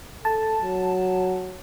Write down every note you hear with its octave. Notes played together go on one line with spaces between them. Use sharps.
A4 A5
F#3